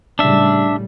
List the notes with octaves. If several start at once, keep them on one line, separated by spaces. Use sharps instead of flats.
A2 C#3 G3 D4 E5